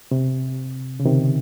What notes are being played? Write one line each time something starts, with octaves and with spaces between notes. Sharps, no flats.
C3
C#3
C3 D#3